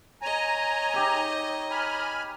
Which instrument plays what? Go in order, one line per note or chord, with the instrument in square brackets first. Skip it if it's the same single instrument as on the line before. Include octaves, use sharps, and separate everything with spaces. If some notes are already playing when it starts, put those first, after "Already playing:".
[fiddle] C#5 D#5 [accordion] G#5 A#5
[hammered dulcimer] D#4 G4 E5
[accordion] G#5 B5 F6